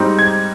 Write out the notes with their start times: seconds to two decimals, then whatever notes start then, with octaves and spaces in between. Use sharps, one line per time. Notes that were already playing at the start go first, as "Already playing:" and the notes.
Already playing: G#2 G3 C4 D#4
0.19 G#6